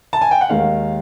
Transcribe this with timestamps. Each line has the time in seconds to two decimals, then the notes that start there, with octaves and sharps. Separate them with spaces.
0.13 A5
0.21 G#5
0.31 G5
0.41 F#5
0.49 D#2 D#3 G#3 F5